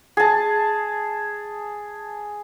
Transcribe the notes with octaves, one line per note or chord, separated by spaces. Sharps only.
G#4 A5